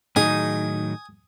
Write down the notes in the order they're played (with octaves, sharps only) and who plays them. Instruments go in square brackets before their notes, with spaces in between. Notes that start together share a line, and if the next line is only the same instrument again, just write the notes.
[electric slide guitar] A2 D#3 F#3 [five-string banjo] D#4 G#4 [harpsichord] G#5 D#6